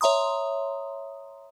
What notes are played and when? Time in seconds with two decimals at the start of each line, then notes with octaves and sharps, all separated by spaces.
0.01 C#5 E5 A#5 C6 D#6